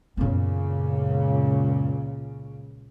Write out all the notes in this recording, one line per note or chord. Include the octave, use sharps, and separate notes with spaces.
C#2 F#2 A#2 C#3 B3